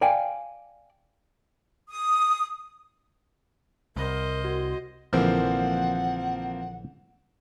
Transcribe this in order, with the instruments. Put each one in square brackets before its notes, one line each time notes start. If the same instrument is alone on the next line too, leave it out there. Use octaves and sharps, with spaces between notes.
[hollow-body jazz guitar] D5 F5 G5 G#5
[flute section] D#6
[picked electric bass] C2 [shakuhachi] A#4 [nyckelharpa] C5 D#5
[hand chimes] F#4
[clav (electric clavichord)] A#1 D3 E3 [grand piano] F3 A#3 C4 [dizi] F#5